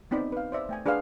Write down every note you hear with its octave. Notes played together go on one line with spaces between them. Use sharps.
B3 C4 D#4 D5 B5
B4 F5
C5 D5 E5
A3 G5 G#5
D4 G#4 B4 D5 F5 F#5